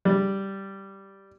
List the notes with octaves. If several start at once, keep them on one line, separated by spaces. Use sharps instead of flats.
G3